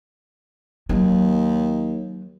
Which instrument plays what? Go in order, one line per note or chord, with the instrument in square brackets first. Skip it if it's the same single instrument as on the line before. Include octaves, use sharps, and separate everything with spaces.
[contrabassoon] D#2 [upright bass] F#3